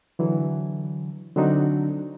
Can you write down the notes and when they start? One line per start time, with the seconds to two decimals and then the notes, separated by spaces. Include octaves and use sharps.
0.19 D3 E3 F#3
1.36 D3 F#3 C4 D4 D#4 F#4